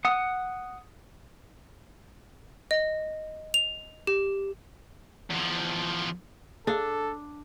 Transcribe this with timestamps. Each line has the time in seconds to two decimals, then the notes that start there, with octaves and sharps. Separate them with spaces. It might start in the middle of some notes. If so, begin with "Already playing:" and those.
0.05 F#5 D#6
2.71 D#5
3.54 F7
4.07 G4
5.30 E2 F3
6.67 D4 G#4 A4 F5